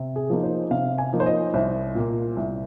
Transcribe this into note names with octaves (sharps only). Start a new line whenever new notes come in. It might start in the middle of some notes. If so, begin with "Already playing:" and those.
Already playing: C3
G#4
F3 A#3 D#4
C5
C3 F5
G#5
F3 A#3 D#4
C5
D#5
C2 C5
A#2 A#3
C2